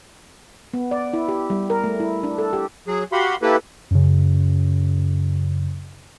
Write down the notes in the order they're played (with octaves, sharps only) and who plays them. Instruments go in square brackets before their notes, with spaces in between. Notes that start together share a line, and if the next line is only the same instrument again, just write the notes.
[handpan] B3
D5
E4
G4
G3
A#4
A3
E4
D4
A4
G4
[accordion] F#3 G#4
F#4 G4 F5 F#5 B5 C6
A#3 E4 G4 A4 B4
[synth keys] F#2 C#3